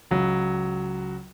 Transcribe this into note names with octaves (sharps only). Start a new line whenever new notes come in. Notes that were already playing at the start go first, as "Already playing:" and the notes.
C#2 F#3